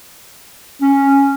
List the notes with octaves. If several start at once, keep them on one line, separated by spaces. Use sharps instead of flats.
C#4